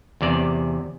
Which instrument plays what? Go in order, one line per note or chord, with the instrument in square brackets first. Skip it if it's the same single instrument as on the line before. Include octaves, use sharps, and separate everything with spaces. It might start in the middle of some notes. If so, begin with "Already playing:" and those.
[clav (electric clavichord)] E2 C3 D5